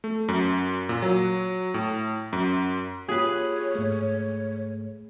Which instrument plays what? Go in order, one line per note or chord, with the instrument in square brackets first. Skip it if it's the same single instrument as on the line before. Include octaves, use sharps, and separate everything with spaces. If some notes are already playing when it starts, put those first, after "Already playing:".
[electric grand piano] A3
F#2
A#2
F#3
A2
F#2
[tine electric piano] A#3 F4 G4 [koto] G#4 B4 [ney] C#5
[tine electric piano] G#2 A3